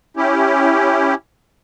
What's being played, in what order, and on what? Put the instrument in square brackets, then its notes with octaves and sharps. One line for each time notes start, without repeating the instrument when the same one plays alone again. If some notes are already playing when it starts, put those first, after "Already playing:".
[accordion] C#4 E4 G4